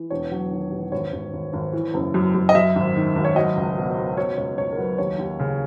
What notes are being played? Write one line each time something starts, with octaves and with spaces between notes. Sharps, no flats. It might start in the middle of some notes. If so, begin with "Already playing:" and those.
Already playing: E3
E1 C#5
F#3
D#3
E1
G#1 C#5
G#1
G#1
G#1
E3
F#1
F#2
F#2
D#5
F#2 E5
G#1
D#3
G#1
C#5
F#3 D#5
C#2
B2
B2
B2 C#5
C#2 C#5
C#2 C#5
A#4
F#3 B4
D#2 C#5
D#2
C#3